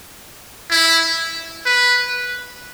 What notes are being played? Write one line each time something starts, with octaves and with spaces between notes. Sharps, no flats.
E4
B4